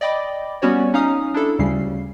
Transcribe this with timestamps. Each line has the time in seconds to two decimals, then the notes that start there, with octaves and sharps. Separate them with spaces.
0.01 D5 D#5 G5 B5 D6
0.62 G3 B3 C#4 F#4 C#5 D5
0.94 C#4 D#4 F5 A#5 D#6 F6
1.34 D4 E4 A4
1.59 D2 C#3 G3 C#4 C7